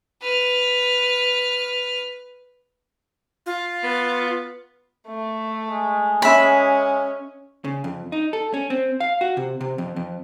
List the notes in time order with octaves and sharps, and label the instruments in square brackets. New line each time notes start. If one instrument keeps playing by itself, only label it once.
[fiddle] B4 F6
[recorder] F4
[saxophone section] B3
[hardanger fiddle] A3
[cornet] G#3
[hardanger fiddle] C#4 [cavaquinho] E5 B5
[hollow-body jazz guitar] C#3
F2
D#4
A4
C#4
C4
F5
F#4
C3
C3
F2
F2